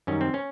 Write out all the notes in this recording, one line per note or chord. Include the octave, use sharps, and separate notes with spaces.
F#2 D#3 G3 C#4
C4
C#4